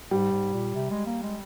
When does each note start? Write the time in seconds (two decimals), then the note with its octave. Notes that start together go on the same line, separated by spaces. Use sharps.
0.11 G#2 G3
0.32 G#2
0.53 A#2
0.75 C3
0.91 G#3
1.06 A#3
1.23 G#3